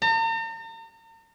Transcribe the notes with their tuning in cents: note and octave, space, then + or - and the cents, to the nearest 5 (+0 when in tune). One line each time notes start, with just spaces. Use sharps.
A#5 -45